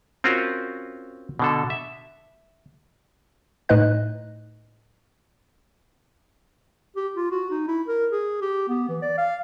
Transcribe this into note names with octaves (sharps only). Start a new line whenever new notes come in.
C4 C#4 F4 F#4 A#4
B2 D3 A4
E5
A2 A3 D#4 B4 D#5 F#6
G4
F4
F#4
D#4
E4
A#4
G#4
G4
B3
E3
D5
F5